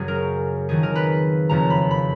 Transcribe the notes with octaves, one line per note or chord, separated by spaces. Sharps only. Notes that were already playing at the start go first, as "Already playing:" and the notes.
Already playing: F#1 F#2 C#3 F#3 G#4
A#4
F2 D#3 F#3 G#4
A#4
B4
F#1 F2 C#3 F3 A#5
B5
B5